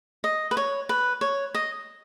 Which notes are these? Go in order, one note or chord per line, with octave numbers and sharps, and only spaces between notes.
D#5
B4
C#5
B4
C#5
D#5